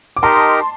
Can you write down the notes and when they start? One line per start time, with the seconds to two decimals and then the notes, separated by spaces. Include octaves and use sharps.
0.17 D6
0.23 D#4 G4 A#4 D#5 A5 C6